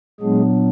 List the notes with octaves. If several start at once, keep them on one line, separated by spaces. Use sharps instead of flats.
A#2 F#3 G#3 B3 D4 G#4